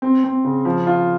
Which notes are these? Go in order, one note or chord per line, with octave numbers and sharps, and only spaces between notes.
C4
C4
C#3
F3
F4